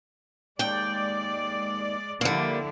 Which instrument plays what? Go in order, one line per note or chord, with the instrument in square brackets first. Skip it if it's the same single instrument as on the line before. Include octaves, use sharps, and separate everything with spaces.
[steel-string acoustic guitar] D#2 G5 [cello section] G#3 D5
[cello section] D3 F3 E4 [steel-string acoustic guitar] G3 A#3